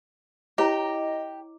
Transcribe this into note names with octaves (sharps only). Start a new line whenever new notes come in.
E4 G4 C#5 D#5 A#5